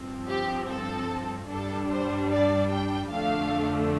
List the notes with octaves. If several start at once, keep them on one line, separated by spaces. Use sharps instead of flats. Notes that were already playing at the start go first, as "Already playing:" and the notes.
Already playing: G2 F3 C4
G4
A4
G2 G3 D4 A4
C5
D5
G5
F2 D3 A3 D4 F5